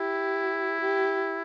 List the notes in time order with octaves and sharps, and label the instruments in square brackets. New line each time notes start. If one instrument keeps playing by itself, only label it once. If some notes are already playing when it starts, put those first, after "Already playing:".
Already playing: [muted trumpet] E4 [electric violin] G4
[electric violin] G4